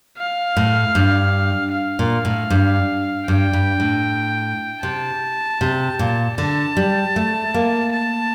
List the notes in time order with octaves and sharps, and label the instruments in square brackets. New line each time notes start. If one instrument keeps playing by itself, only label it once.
[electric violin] F5
[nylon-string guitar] A2
G2
[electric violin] F5
[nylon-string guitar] A#2
A2
G2
[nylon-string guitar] G2 [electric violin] G5
[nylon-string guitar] G2
A2
[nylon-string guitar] C3 [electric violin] A5
[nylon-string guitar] C3
A#2
[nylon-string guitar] D3 [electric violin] A5
[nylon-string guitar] G3
A3
A#3
[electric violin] A5